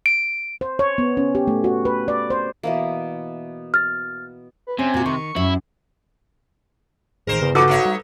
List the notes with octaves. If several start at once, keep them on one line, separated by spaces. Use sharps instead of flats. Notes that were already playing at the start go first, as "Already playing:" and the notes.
D7
C5
C#5
B3
C#4
G4
A3
F#4
B4
D5
C5
B2 E3 A#3
F6 A6
B4
C3 C#4 G#5
A#2 F#4
D#3 C#6
F#2 E4
A1 G#2 D#3 A#4 C5
G1 E2 C#3 B3
F3 D#4 F#4 A4 B4 D6
A3 D#4 C#5
G3